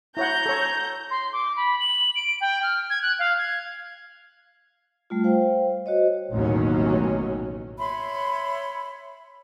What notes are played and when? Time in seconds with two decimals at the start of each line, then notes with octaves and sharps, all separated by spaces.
0.17 E4 C#5 F#5 A#5 G6
0.46 A4 C#5
1.11 C6
1.33 D6
1.57 B5
1.80 F#7
2.16 D7
2.41 G5
2.63 F6
2.90 G#6
3.02 F#6
3.19 F5
3.38 G#6
5.10 G3 A3 F4
5.24 C5 F5 G5
5.86 F#4 C5 C#5 D#5
6.32 A1 D#2 B2 F#3 C#4
7.79 C#5 E5 B5 C6